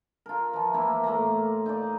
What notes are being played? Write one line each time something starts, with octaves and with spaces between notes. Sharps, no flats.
F4 A#4
E3 F3
E3 A#3 E4
A2 A#3 F4 A#5
D#4 D5